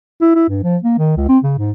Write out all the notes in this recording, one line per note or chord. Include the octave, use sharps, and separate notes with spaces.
E4
E4
G2
F3
A#3
D#3
C#2
C4
C#3
G#2